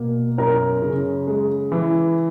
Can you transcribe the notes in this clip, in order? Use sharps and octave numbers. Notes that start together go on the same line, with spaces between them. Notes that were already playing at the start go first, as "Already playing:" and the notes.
Already playing: B2 A#3
F#2 A#4
C#3
G#3
E3